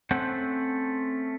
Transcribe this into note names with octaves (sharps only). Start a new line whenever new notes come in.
A3 C4 C#4 C5 F#5